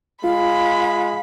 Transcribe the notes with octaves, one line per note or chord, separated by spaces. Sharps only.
G#3 F4 F5 B5